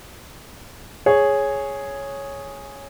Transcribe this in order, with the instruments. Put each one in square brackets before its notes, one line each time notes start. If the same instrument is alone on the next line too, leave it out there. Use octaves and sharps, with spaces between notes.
[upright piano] G#4 C#5